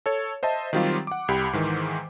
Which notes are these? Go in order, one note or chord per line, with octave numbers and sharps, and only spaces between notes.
A4 C#5
C5 D#5 E5 A5
D#3 F#3 G3 C4 F4 G4
F#5 D6
C2 G4 B5
G#2 D#3 E3